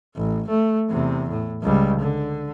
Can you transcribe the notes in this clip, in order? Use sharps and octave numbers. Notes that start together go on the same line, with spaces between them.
A1
A3
E2 C3
A2
C#2 G3
D3